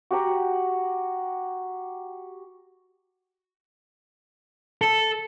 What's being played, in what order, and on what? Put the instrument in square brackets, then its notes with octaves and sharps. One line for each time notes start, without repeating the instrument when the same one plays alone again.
[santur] F#4 G4 F#5 A#5
[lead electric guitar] A4